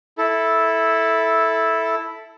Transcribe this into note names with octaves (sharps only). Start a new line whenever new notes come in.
E4 A4